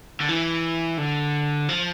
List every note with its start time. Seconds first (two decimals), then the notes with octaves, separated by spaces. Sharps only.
0.20 D3
0.28 E3
0.98 D3
1.69 F3